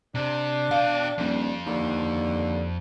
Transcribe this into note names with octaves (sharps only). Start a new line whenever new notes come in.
C3 D4
B2 F5 G5
D#1 F2
D#2 D3